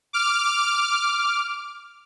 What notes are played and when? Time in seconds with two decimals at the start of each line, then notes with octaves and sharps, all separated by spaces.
0.13 D6 F6